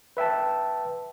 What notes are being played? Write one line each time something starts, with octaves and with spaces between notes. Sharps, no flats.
B4 E5 G5 A5